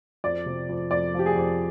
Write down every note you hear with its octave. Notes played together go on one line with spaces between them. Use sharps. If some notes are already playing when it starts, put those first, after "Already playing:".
F2 D5
C3
F2
F2 D5
F3 G4
G#4
F2